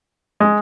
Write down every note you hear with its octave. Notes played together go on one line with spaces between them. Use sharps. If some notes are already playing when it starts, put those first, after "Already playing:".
G#3